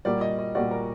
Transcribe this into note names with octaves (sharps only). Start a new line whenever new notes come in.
A#2 G3 A#3 F#4 D5
D#5
D#5
A#2 G3 A#3 F#4 D5
A#4